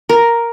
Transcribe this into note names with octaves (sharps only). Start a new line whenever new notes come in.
A#4